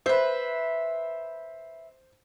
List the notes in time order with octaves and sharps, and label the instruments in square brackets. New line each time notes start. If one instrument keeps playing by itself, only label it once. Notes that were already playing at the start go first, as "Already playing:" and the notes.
[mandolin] B4 E5 [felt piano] C5